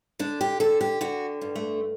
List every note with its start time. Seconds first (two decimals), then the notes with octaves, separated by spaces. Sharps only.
0.19 D3 D4
0.41 G4
0.60 D3 A4
0.81 G4
1.01 D3 F#4
1.41 G2
1.56 A3